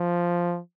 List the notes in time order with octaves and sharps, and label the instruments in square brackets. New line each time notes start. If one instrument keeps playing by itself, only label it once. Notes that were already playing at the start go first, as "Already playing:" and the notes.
Already playing: [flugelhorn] F3